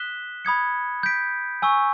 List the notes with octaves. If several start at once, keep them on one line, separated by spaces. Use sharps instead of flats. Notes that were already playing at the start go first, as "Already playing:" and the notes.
Already playing: D#6 F#6 B6 E7 G7
B5 D#6 G#6 C#7
G6 B6 D7
G#5 C#6 E6